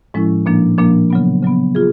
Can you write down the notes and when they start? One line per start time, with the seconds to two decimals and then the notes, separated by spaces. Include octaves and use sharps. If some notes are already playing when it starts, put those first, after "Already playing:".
0.14 A2 F3 G#3 C#4 E4
0.46 A#2 F3 A#3 D4
0.78 A#2 F3 A#3 D4
1.10 C#3 F#3 B3
1.43 C#3 F#3 B3
1.75 F4 G#4